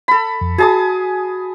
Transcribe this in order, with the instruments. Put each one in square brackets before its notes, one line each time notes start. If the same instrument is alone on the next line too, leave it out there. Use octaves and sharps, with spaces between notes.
[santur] A4 B5
[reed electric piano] F2
[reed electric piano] F#4 [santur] G#4 A5 D#6